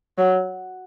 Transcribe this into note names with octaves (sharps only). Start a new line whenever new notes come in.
F#3